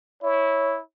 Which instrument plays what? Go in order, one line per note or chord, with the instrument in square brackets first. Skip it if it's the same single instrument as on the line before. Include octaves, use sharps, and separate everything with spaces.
[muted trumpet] E4 [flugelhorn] C#5